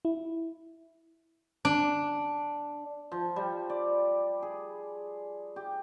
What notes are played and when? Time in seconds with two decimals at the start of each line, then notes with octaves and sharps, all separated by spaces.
0.05 E4
1.65 D4
3.12 F3
3.36 G3
3.70 D5
4.42 G#4
5.56 G4